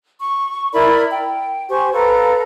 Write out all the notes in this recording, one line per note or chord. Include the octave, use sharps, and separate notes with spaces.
C#6
E4 A#4 D5 B5
G5
G4 C5 G#5 C#6
A4 B4 F5 A#5